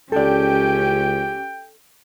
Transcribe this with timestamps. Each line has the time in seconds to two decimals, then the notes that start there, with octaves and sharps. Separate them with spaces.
0.12 C#2 C#4 G4 A4 D5 G5